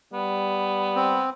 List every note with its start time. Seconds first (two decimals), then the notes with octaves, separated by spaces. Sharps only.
0.13 G3 B3
0.96 C4